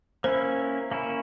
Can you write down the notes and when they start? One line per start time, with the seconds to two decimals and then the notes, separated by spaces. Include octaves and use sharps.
0.24 A#3 C#4 E4 C5
0.91 A#3 C#4 E4